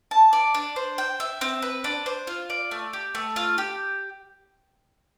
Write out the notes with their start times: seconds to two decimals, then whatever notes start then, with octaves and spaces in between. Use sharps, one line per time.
0.11 A5
0.33 D5
0.54 D4
0.76 C5
0.98 G5
1.20 E5
1.41 C4
1.62 B4
1.84 D4
2.06 C5
2.27 F4
2.50 D5
2.71 A3
2.93 G4
3.15 A3
3.36 F4
3.58 G4